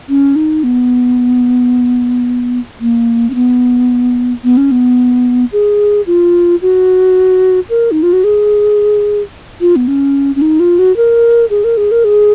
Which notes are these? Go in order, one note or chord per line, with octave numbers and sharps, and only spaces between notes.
C#4
D#4
B3
A#3
C#4
B3
B3
C#4
B3
G#4
F4
F#4
A#4
D#4
F4
F#4
G#4
F4
B3
C#4
C#4
D#4
F4
F#4
A#4
G#4
A#4
G#4
A#4
G#4